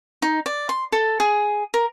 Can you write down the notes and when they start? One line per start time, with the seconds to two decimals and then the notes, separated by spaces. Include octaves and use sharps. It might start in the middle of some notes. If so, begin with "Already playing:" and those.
0.22 D#4
0.46 D5
0.69 C6
0.92 A4
1.20 G#4
1.74 A#4